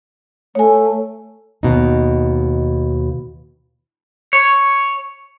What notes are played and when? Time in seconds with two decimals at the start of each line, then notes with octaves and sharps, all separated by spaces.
0.55 A3 C#5 G#5
1.63 D#2 B2 D#4
4.33 C#5